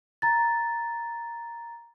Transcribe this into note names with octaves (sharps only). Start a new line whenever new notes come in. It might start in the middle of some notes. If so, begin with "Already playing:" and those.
A#5 A6